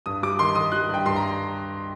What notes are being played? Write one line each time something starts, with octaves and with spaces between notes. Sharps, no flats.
G2 D#6
G3 D6
D#3 C6
D#3 D#6
G3 F#6
G2 G5
G2 C6
A#5